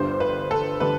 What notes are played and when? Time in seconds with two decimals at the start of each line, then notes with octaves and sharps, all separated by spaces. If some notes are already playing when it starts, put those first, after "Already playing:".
Already playing: G1 G2 D3 G3 C5
0.20 B4
0.51 A4
0.80 D3 G3 B4